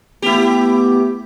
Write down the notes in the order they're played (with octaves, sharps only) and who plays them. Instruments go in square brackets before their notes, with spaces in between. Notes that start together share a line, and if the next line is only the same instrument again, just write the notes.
[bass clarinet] A3 [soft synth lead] B3 [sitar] E4 G4